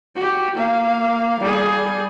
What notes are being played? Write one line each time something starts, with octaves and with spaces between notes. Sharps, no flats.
F#4 G4
A#3 F5
G3 G#4